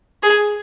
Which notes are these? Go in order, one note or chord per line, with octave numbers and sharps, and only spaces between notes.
G#4